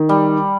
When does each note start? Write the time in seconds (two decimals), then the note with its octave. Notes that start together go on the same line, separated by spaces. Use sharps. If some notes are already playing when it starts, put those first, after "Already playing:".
Already playing: D#3
0.09 G3